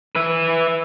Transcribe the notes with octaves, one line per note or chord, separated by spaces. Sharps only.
B4 E5